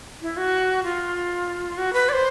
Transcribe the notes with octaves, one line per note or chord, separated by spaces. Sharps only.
E4
F#4
F4
F#4
B4
D5
C5